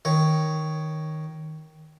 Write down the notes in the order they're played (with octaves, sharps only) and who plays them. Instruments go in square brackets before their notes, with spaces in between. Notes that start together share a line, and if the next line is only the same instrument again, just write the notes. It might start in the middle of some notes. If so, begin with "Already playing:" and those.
[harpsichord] D#3 C#5